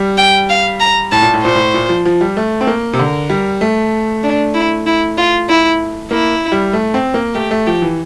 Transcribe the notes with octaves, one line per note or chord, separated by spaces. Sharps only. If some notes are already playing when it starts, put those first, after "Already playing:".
Already playing: G3
G5
F5
A#5
A2 A5
A#2
A2
A#2 C5
A2
A#2
F3
F3
G3
A3
C4
A#3
C3
D3 A#4
G3
A3
D4
E4
E4
F4
E4
A#3 E4
G3
A3
C4
A#3
A3 G4
A3
F3 G4
E3